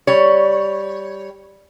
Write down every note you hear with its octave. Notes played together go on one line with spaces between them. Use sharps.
G3 C#5